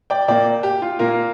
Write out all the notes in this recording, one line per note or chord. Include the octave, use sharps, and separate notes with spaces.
D5 G5
A#2 A#3 D5 G5
G4
F4
A#2 A#3 F4 A#4